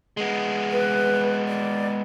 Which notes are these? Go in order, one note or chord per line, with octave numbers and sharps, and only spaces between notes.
G#3 B3
B4
D5